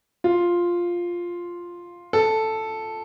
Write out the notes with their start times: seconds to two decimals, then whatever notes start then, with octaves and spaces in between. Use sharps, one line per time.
0.24 F4
2.13 A4